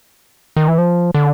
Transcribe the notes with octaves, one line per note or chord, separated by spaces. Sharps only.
D#3
E3
F3
D3